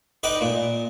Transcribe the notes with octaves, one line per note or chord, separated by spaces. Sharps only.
D#4 B4 D5 D#5 G5
A#2